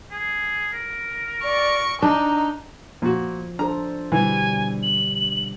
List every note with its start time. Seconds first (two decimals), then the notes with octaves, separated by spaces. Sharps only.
0.11 G#4
0.72 A#4
1.43 D5 C#6
2.02 D4 D#4 A#5
3.02 A#2 F3 F#4
3.59 D4 A4 C5 A#5
4.12 B2 D3 E3 G3 G#5
4.83 F#7